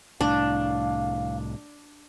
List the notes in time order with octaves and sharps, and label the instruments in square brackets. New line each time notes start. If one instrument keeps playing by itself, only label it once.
[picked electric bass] C2 A2 [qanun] D4 [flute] F5